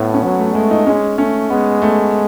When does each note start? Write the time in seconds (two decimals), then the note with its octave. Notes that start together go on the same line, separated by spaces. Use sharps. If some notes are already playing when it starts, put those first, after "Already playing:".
Already playing: A2 A3 B3
0.14 C#4
0.23 F#3 B3
0.39 A3
0.55 G#3 A3
0.71 D#4
0.87 G#3 C#4
1.18 A3 C#4
1.50 G#3 B3
1.82 A3